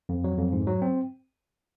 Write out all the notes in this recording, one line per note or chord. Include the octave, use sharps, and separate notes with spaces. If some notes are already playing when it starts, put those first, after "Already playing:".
F2
F#3
F2
G#2
F#3
C4